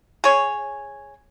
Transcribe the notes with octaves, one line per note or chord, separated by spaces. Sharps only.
G#4 C#5